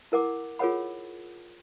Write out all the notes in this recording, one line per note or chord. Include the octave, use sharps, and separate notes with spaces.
E4 A#4 F#5 D6
F4 G#4 A#4 C#5 F#5 B5